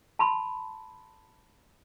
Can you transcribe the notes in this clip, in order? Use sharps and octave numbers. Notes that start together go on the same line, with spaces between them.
A5 B5 C6